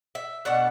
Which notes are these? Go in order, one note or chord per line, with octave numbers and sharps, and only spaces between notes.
E5
B2 A3 D4 F#5